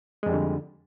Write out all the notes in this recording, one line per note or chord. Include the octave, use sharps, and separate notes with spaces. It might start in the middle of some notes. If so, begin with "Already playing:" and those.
F2 D3 G3 G#3